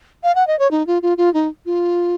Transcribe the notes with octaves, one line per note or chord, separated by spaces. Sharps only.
F5
F#5
D#5
C#5
D#4
F4
F4
F4
D#4
F4